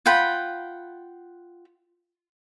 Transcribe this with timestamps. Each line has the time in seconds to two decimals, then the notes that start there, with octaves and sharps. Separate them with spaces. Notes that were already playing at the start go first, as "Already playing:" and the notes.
0.06 F4 F#5 G5 B5